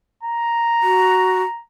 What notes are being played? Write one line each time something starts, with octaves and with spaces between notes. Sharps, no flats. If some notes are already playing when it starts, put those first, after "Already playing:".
A#5
F#4